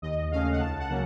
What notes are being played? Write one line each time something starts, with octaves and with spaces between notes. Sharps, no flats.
D#2 D#5
C#3 A3 C#4 F5
F#5
C#2 A5
F#5
C#3 F#3 A#3 C#4